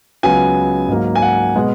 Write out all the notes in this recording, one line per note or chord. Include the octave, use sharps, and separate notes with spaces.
C#2 C#3 F#3 B3 G#5
G#2 F#3 A#3
G#5
F#5
B2 G#3 B3